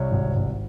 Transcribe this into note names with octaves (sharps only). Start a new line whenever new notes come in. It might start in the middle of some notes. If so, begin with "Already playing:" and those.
Already playing: C2 C#5
G#1
G#1